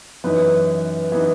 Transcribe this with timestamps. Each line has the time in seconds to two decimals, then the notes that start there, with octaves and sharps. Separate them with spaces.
0.24 F#2 E3 B3 D#4 B4
1.12 E3 B3 D#4